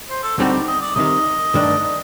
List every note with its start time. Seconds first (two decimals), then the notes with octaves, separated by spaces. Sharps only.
0.09 C5
0.23 A4
0.38 D2 D3 G3 C4 D#4 F#4
0.53 G4
0.67 D#5
0.81 D5
0.95 C2 C3 D#3 D#5
1.54 G2 D#3 A3 D4